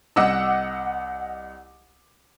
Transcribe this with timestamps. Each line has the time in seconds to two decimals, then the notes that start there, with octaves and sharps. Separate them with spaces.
0.16 C2 D#5 F#5 D6 E6